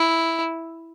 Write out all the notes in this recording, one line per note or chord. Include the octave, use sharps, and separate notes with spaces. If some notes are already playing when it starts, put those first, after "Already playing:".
Already playing: E4